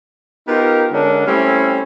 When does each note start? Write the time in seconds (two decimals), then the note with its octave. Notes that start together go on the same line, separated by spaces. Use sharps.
0.48 B3 D#4 F4 G4 A#4
0.92 D3 G#3 C#4 D4 A#4
1.27 G3 A3 C4 C#4 E4